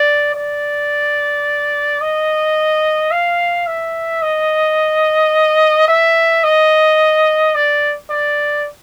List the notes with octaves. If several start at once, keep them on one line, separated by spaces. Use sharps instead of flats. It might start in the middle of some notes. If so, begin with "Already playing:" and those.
Already playing: D5
D5
D#5
F5
E5
D#5
E5
D#5
D5
D5